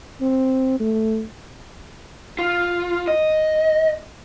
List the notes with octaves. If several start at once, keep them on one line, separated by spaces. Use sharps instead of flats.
C4
A3
F4
D#5